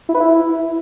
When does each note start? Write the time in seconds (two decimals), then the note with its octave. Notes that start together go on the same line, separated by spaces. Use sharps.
0.09 E4
0.15 B4
0.20 E4